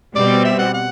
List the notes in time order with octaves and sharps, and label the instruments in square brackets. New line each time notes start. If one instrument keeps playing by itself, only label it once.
[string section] B2 G3 C4 [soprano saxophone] D5
[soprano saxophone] E5
F#5
F#5